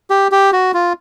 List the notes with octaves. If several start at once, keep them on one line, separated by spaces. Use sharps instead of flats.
G4
G4
F#4
F4